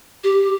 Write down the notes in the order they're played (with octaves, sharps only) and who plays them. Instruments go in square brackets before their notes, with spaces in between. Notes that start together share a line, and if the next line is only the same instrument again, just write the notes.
[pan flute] G4